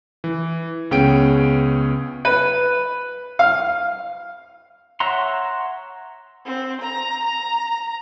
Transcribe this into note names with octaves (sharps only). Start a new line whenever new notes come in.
E3
C#2 B3 C#4 G#4 G5 D7
B4
F5
C#5 E5 F#5 A#5 C6
C4
A#5
A#5